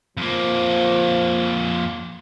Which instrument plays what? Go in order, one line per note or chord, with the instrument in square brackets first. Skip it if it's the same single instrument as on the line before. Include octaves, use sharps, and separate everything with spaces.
[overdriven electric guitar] F2 A#3 [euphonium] F3